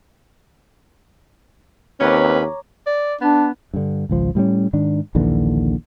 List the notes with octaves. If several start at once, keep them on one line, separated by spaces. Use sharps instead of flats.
D#2 C4 C#4 B4 C#5 A#5 D6
D5
B3 D4
G2 D3
G#1 C#2 F3
A2 G3 A#3 C#4
G#2 D#3 D4
A#1 D#2 D3 E3